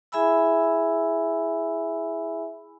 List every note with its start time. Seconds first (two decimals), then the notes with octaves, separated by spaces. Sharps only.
0.12 E4 G#4 E5 G#5 B5 E6